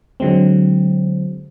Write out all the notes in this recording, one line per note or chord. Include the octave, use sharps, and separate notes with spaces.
D3 F#3 G#3 C4